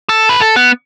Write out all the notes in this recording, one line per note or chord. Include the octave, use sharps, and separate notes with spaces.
A4
B4
A4
B3